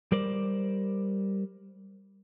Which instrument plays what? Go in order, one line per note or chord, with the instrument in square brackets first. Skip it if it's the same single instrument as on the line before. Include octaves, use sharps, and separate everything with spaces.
[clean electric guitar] G3 A#4 C5 D5